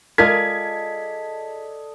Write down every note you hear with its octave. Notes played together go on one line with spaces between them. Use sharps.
G#3 F4 A4 A#4 D5 D#5 G#6 B6